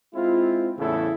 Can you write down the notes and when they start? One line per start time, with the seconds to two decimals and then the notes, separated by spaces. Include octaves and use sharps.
0.14 G#3 C4 E4 F4
0.78 E2 A2 C#3 E4 A4